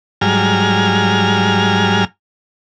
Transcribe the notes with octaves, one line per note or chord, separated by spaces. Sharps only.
G#2 F#3 G3 G#5 A#5 F6